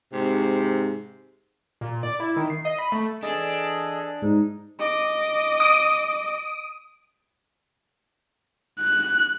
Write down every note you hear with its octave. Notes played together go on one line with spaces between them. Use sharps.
G#2 C3
A#2
D5
E4
D#3
C7
D#5
B5
A3
E3 D4 G#4 A4 D#5
G#2 D#4
D#5 D6
D#6 D7
F#6